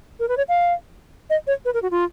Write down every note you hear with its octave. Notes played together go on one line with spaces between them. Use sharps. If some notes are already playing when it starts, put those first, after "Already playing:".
A#4
B4
C#5
F5
D#5
C#5
B4
A#4
F#4
F4